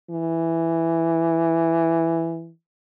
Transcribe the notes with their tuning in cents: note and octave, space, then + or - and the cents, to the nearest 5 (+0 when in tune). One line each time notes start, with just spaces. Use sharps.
E3 +5